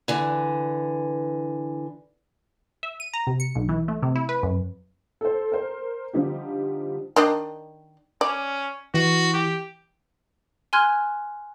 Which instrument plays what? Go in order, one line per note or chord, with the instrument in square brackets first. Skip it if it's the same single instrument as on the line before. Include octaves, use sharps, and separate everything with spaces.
[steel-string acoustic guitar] D3 E3
[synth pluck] E5
D#7
A#5
C3
C#7
B1
E3
A3
C3
E4
B4
F#2
[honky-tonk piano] A4 C5
A#4 C5
D3 F3 G3 D#4 G4
[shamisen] D#3 D4 D#5
[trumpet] C#4 [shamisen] D5
[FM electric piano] E3 [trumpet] F#4
[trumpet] G4
[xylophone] G#5 C6 F6 F#6 G#6